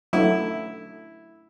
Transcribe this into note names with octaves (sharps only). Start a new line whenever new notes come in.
F#3 A3 D4 E4